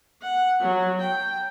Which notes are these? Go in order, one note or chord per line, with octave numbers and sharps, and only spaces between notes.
F#5
F#3
G5